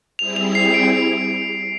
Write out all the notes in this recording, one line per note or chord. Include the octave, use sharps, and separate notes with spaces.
G3 C4 E4 G#4 F7
F7
C7
D7